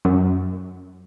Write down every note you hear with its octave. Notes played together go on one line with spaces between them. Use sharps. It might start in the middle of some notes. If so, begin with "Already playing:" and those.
F#2